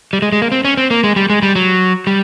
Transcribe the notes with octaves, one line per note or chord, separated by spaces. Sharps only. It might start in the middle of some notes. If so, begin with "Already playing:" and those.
G3
G#3
G#3
A#3
C4
C#4
C4
A#3
G#3
G3
G#3
G3
F#3
G3